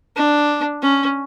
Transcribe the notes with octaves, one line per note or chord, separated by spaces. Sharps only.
D4
C#4